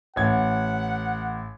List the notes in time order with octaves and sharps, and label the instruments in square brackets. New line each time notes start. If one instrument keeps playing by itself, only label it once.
[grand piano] A1 G#6 [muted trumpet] F#5